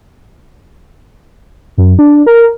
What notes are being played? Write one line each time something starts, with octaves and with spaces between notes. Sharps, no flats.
F#2
D4
A#4